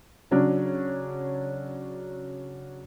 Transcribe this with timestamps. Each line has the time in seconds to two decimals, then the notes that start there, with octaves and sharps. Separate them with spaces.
0.31 C#3 F#3 C#4 D4